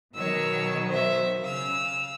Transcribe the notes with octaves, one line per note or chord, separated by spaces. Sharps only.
B2 D#3 F#3 C#5 E6
C5 E5
C#3 F5 E6